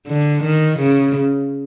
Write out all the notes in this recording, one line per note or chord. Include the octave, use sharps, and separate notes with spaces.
D3
D#3
C#3